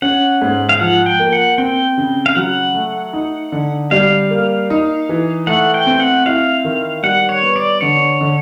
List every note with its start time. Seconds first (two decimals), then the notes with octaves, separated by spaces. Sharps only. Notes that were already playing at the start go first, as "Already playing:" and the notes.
0.02 C#4 F#5
0.42 G#2
0.69 F5
0.80 F3 F#5
1.06 G5
1.19 A#3
1.33 F#5
1.58 C4 G5
1.98 C#3
2.26 F5
2.35 F#3 F#5
2.74 A3
3.13 D#4
3.52 D3
3.91 G3 F5
4.30 A#3
4.70 D#4
5.09 E3
5.47 A3 F#5
5.74 G5
5.86 C4
6.00 F#5
6.26 E4 F5
6.65 D#3
7.03 G3 F#5
7.29 C#5
7.43 B3
7.56 D5
7.81 D3 C#5
8.21 D3